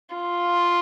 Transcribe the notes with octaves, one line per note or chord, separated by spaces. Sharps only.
F4